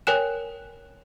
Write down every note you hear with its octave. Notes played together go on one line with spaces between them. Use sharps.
A#4 C#5 G5 G#5 F#6 E7